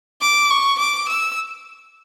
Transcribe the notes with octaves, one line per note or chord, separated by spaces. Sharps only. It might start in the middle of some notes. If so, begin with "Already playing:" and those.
D6
C#6
D6
E6